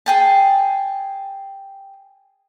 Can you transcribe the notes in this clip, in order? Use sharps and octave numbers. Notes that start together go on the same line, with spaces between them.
G#4 G5 A5